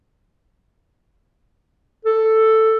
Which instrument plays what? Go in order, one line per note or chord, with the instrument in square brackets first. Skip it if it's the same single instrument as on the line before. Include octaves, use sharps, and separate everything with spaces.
[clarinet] A4